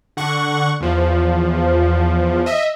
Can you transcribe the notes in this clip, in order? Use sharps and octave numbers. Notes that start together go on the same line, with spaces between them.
D3 F#5 C#6
E2 F3
D#5 E5